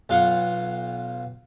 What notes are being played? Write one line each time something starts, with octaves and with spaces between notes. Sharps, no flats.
B1 F4 F5 F#5